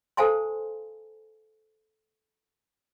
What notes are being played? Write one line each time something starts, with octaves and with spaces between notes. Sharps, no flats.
A4 C5 F5 G#5 A5 C6